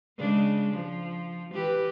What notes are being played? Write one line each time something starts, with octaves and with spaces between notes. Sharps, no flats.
C#3 G#3 D4
F3
E3 G4 B4